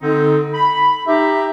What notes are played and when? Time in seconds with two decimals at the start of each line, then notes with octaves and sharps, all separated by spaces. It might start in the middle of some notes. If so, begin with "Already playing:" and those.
0.01 D3 C4 D#4
0.53 B5
1.07 D#4 G4 E5